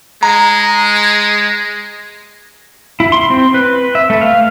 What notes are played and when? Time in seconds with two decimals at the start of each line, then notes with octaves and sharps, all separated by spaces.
0.23 G#3 A#5
3.00 E4
3.12 C6
3.30 C4
3.54 B4
3.95 E5
4.10 A3
4.21 F5